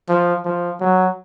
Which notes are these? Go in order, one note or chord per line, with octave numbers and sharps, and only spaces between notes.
F3
F3
F#3